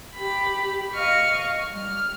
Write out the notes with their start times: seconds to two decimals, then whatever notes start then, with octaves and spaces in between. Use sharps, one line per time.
0.13 G4 B5
0.93 D#5 F5 C#6 F6
1.68 G3 F6